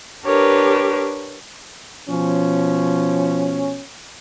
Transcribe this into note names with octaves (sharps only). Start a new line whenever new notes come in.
D4 G4 A#4 B4 C#5
B2 F3 C#4